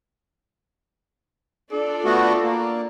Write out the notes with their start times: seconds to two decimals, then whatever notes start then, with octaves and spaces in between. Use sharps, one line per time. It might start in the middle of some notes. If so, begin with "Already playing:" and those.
1.72 D4 F4 A4 D5
2.05 A3 B3 F#4
2.44 A#3